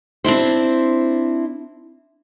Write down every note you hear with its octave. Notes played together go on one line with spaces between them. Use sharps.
C4 D4 E4 C5